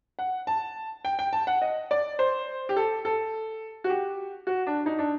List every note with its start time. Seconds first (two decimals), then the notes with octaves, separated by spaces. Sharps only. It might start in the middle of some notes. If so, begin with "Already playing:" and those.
0.19 F#5
0.47 A5
1.05 G5
1.19 G5
1.33 A5
1.47 F#5
1.62 D#5
1.91 D5
2.19 C5
2.69 G4
2.76 A4
3.05 A4
3.84 F#4
3.90 G4
4.47 F#4
4.67 D4
4.86 D#4
4.99 D4